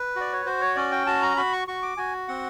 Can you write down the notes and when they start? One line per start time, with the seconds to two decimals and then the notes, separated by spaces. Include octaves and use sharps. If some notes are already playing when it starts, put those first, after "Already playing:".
Already playing: B4
0.16 F#4 D5
0.33 C#5
0.46 F#4 C5
0.61 C#5
0.76 C#4 D5
0.92 G5
1.06 F#4 A5
1.22 A#5
1.37 F#4 B5
1.53 C#6
1.68 F#4 C#6
1.83 D6
1.97 F#4 G#5
2.28 C4 F#5